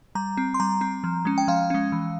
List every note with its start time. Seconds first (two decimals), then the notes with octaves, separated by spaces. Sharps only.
0.15 G3 A#5
0.37 C4
0.54 C6
0.60 G3 A#5
0.81 C4
1.04 F3
1.25 G#3 C#4
1.38 G5
1.48 F3 F5
1.70 G#3 C#4
1.92 E3